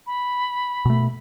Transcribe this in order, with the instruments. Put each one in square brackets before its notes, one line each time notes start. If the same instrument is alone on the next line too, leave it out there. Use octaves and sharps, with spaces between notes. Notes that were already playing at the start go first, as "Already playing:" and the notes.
[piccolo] B5
[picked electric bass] B2 A3